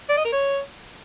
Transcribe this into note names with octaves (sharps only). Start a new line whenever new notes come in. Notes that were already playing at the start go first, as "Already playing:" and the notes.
D5
D#5
A#4
C#5